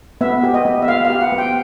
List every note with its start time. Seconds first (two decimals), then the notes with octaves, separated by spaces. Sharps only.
0.21 B3 E5
0.43 G4
0.54 D#5
0.65 B3
0.82 E5
0.88 B3 F5
1.05 G4 F5
1.21 F#5
1.32 B3
1.38 G5